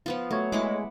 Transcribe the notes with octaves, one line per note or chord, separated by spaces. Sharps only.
F3 B3 F4
F#3 A3 C#5
G#3 E4 F#5 D6